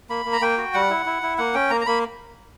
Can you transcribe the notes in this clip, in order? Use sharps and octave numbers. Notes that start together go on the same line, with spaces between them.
A#3 B5
A#3
A#5
A#3 G5
F#4
G3 F#5
E4
E4
E4
A#3 F#5
C#4 G5
A#3 A#5
A#5
A#3 B5